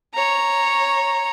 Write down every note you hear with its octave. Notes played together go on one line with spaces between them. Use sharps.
C#5 A#5